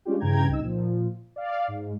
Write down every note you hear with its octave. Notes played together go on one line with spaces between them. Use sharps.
G#3 C#4 D4 F4 G4
G2 C#3 E3 G5 A#5 G#6
C2 D#4 E6
A#2 F3
D5 F5
G#2